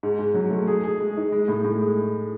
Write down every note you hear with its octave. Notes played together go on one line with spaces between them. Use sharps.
G#2
G#2
F#3
A3
G#4
G#4
G#3
D#4
G#3
A2
A2
G#3